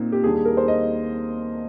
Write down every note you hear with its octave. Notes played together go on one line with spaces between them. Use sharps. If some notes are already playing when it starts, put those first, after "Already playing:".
Already playing: A#2 C4 D#4
G4
D#2 D#3 G3 D4 G#4
G#4
A#4
C5
D#5